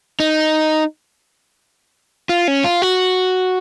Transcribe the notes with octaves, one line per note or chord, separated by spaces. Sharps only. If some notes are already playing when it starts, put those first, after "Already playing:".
D#4
F4
C#4
F4
F#4